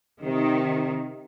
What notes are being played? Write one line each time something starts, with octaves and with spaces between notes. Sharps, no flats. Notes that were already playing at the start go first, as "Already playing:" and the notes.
C3 D#3